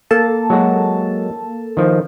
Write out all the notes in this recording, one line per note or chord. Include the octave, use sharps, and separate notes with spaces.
A#3 A4 A5
F#3 G#3 F#4
D#3 F3